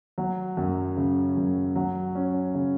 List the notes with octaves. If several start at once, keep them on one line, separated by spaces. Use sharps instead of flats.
F#3
F#2
C#3
F#2
F#3
C#4
C#3